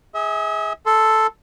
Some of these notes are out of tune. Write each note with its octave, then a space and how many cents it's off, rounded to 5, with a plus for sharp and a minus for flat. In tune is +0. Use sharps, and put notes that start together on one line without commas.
G#4 -5 E5 -40
A4 +0 C6 +0